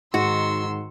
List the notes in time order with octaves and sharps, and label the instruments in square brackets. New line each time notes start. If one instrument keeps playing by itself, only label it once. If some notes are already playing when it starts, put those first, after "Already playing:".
[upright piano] G#2 [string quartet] D#3 C6 E6 [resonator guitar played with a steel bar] F#4